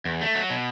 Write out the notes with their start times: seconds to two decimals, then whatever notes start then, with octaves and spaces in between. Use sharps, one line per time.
0.05 E2
0.21 A3
0.35 F#3
0.50 B2